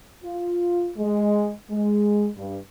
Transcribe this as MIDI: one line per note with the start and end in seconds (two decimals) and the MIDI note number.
0.24 0.90 65
0.97 1.51 56
1.70 2.28 56
2.36 2.57 43